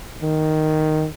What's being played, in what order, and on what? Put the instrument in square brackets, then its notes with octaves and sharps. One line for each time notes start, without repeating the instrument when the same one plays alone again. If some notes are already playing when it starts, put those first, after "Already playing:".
[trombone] D#3